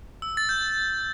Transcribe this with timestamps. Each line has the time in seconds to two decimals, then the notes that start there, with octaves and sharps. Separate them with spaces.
0.22 E6
0.37 A6
0.49 G6